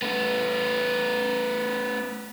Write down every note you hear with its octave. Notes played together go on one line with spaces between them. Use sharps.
A3 B3